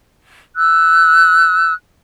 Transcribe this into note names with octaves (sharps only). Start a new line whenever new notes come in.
E6 F#6